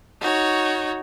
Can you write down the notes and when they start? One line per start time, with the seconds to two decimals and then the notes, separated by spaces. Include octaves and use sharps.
0.21 D#4 F#4 C#5